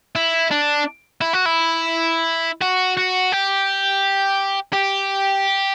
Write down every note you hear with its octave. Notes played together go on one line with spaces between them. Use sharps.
E4
D4
E4
F#4
E4
F#4
F#4
G4
G4